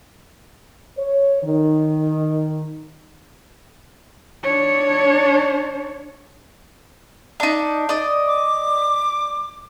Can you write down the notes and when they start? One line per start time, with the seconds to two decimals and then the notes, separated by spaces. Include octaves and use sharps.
0.97 C#5
1.43 D#3
4.43 D4 C#5
7.40 D4 D#4
7.89 D5 D#5
8.27 D6